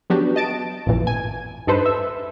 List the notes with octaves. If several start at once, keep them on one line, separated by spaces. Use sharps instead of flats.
C#3 F#3 B3 D4 F#4 G4
D#5 A5 D7
A1 F2 A#2 E3
G#5
G2 D#4 A4 B4 C5
E5